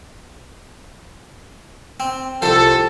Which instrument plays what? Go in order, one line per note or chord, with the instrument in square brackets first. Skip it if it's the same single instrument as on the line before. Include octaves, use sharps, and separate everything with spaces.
[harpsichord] C4
[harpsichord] C2 F2 C5 [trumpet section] A4